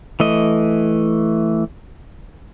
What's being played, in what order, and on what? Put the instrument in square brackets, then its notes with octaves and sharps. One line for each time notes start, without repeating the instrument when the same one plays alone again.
[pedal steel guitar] E3 A3 D#5